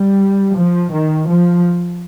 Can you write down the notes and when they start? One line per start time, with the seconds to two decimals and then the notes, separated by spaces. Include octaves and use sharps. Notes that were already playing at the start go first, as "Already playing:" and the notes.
Already playing: G3
0.55 F3
0.92 D#3
1.26 F3